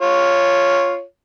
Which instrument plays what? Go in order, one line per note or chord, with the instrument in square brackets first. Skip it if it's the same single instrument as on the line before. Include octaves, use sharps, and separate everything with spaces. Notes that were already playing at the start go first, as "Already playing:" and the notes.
[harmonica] F4 C#5